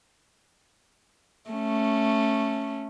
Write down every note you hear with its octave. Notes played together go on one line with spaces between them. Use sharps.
A3 C#4